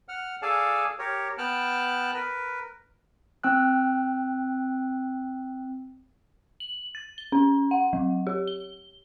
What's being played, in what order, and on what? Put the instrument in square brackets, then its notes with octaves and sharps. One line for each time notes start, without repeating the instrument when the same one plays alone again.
[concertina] F#5 F6
G#4 A4 D5 F5 G#5 A5
G4 A#4 C#5
B3 G5 A5 F6 F#6
A#4 B4
[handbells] C4 G5 E6 F#6
[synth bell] F#7
A6
G7
C#4
F#5
F#3
G4
G7